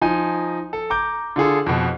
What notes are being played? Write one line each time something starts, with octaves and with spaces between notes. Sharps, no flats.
F3 D#4 G#5
A4
A#5 D6 G6
D3 F4 G#4 A4
F2 B2